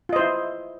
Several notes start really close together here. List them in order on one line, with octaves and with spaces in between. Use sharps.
F4 D#5 C5 E4